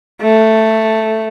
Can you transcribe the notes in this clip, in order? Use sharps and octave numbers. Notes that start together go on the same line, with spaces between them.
A3